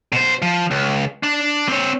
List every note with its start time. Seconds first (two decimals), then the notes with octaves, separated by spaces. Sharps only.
0.13 B2 C5
0.42 F3
0.71 C#2
1.23 D4
1.68 C4 C#5